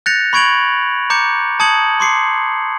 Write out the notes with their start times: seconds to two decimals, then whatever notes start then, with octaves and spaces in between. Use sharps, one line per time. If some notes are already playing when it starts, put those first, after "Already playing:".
0.06 F#6 G6 A6 A#6 C#7 F7
0.33 B5 C#6 G#6 D7 F7 F#7
1.10 A#5 D6 G6 C#7
1.60 A5 D#6 G#6 C#7 F#7
2.00 C6 D6 C7 C#7